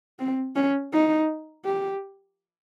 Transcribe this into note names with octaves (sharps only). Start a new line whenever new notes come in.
C4
C#4
D#4
G4